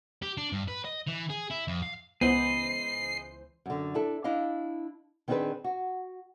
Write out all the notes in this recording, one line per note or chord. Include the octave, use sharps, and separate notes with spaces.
G4
D4
G2
B4
D#5
E3
G#4
E4
F2
F5
C#2 E3 B3 G#4 B4 C5 D#5 C7
F#2 D3
D4 E4 A4
D4 E4 D#5 F5
D#3 B3 C4 D4 G#4 B4
F#4